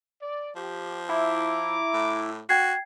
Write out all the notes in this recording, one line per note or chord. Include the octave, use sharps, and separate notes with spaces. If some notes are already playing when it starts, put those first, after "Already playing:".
D5
F3 G4
E4 A#5 D6
A2
F#4 G5 G#6 C7